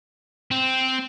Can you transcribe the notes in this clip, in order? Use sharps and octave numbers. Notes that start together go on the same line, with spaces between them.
C4